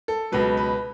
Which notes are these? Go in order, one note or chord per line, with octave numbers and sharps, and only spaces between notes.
A4
C#2 B2 F#3 B4
B4